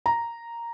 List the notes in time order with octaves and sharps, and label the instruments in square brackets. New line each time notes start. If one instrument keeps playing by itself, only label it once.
[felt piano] A#5